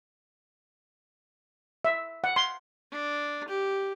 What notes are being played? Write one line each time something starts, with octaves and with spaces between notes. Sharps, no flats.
E5
F#5
C6
D4
G4